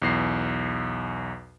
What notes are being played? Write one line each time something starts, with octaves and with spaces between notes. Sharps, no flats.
B1 E2 C7